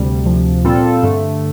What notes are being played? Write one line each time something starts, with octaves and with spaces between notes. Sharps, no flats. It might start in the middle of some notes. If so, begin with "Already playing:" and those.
Already playing: D2 C3 G3
D2 C3 F3
A#2 G3 C4 F4 A4
G2 D3 A3